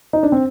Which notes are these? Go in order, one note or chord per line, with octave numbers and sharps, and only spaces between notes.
D#4
D4
C4